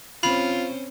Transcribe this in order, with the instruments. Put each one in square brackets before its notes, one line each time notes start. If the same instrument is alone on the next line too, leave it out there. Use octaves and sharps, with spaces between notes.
[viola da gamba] C4 C#4 C5 [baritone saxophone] F4 [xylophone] B5